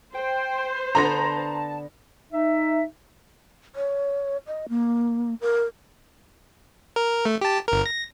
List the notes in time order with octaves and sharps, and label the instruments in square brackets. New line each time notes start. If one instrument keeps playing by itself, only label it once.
[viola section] C5 [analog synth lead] G5
[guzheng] D3 B3 D4 [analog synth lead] A5 [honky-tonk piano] A#5 C6 A#6
[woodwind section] D#4 E5
[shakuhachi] C#5
D#5
A#3
A#4
[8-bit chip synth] A#4
A3
G4 A5
G1 A#4
A#6